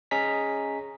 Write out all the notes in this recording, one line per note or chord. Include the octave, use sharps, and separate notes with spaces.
C#4 G#4 D#5 A#5 B6